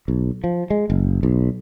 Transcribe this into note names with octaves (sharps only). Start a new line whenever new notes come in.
B1
F3
G#3
F#1
B1